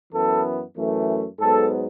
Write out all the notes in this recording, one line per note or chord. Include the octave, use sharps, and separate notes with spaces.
F#2 E3 B3 A4
F#2 E3 A3
G#2 F#3 B3 A4